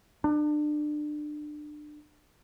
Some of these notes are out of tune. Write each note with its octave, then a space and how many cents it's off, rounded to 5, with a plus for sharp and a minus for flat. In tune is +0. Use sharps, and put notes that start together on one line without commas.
D4 +30